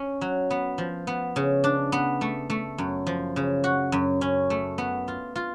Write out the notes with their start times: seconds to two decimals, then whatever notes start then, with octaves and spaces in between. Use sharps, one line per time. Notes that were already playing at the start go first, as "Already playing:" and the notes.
Already playing: C#4
0.21 F#3
0.51 B3
0.78 F3
1.07 B3
1.36 C#3
1.64 D4
1.92 B3
2.21 A3
2.50 A3
2.78 F#2
3.07 F3
3.36 C#3
3.64 F#4
3.92 F#2
4.21 C#4
4.50 A3
4.78 B3
5.08 F4
5.36 F4